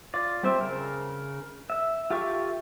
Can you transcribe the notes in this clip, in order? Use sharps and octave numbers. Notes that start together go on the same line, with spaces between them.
F4 D5
G3 C4 G4 C5 E5
C#3 A#4
E5
F4 G4 A4 E5 C#6